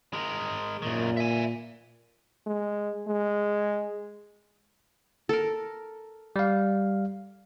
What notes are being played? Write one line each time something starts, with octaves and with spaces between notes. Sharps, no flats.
G#3 A#4
F#2 A#2 D#3
E5 G#5
G#3
G#3
A4 A#4
G3 F5